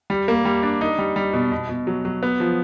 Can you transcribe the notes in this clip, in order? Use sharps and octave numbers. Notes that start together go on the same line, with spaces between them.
G3
A#3
G3
D4
D#4
G3
G3
B2
B2
B2
F#3
F#3
B3
F3